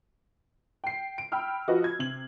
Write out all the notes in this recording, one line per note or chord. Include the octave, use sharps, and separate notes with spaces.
G5 C7
D7
G5 B5 E6 F6
F3 F#4 B4 D#5
G#6
C3 F#7